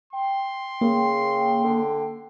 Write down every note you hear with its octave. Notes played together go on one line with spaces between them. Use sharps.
G5 C6
C#3 A#3
D3